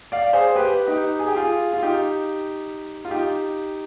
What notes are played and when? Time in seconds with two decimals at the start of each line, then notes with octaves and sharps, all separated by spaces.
0.12 D5 F5
0.33 G#4 C5
0.55 G4 B4
0.87 D#4 G4
1.19 G#4
1.28 G4
1.36 F4 G#4
1.73 F4
1.83 D#4 G4
3.05 F4
3.11 D#4 G4